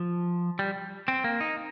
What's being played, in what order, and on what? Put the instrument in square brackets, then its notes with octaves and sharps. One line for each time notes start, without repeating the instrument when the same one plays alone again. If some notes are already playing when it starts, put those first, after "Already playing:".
Already playing: [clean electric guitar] F3
G3
C4
A#3
D#4